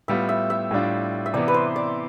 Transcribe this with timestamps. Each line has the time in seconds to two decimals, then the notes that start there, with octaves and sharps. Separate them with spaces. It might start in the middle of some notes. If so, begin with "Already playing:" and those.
0.08 A2 G3 B3 F4 E5
0.29 E5
0.50 E5
0.71 A2 G3 D4 F4
1.26 E5
1.34 C3 E3 B3 D5
1.48 B4
1.54 C5
1.76 D5